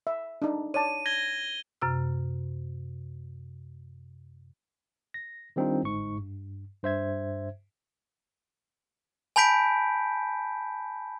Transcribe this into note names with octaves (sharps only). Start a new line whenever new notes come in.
E5
D4 D#4
C#5 D5 A5 D#7
G#6 A#6 G7
F#2 C3 F6
A#6
D#3 G3 C4 D4 D#4 F4
G1 G#2 C#6
G2
G2 C5 E5 G#6
G#5 A5 B5 G6 B6 D7